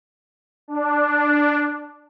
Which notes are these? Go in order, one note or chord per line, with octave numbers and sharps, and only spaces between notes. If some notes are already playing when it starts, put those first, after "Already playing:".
D4